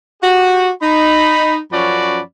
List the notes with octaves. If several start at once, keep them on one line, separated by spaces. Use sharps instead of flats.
F#4 G4
D#4 B5
F#2 F3 C#4 F#4 D5 B5